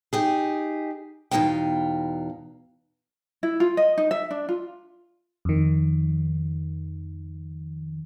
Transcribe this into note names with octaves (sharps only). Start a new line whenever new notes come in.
D#4 G4 G#4
E2 B2 D#3 D#4 F5 G5
E4
F4
D#5
D#4
E5
D4
F4
F2 D#3